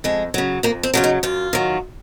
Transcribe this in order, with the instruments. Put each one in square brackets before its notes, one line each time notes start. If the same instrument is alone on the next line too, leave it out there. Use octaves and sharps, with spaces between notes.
[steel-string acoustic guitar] F2 G#3
C#3 F#3
F2 A#3
C4
C#3 F#3 F4
D#4
F#2 F4
D#3 F#3